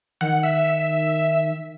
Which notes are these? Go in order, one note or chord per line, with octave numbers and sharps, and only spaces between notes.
D#3 F#5
E5